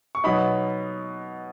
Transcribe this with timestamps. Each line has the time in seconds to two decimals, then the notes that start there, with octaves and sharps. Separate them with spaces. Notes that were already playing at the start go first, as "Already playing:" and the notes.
0.15 C#6
0.24 B2 F#3 B3 D#4 B5